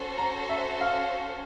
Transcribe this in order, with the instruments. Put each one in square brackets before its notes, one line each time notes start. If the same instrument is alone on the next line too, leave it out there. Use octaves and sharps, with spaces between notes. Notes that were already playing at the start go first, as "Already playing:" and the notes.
Already playing: [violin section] C#4 F#4 A4 C5
[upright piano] A#5
E5
F5